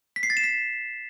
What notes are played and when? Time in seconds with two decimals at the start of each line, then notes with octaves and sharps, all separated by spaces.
0.16 B6
0.23 C7
0.30 A6
0.37 E7
0.44 B6